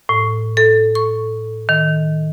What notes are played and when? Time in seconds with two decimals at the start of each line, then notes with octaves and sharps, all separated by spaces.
0.09 A2
0.57 A4
0.95 C#6
1.69 D#3